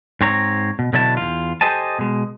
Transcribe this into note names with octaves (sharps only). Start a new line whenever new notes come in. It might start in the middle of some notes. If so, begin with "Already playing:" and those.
G#2 C4 C#5 A#5
B2
B2 D3 F#3 E4 C5 A5
E2 F4
G4 A4 C5 D#5 G#5 A5
B2 G#3